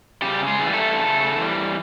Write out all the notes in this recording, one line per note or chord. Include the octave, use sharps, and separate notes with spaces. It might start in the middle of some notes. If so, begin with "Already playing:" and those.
C#3 G3 G4
G#3 G#4
E3 G3
A3 A4
C#3
E3 G3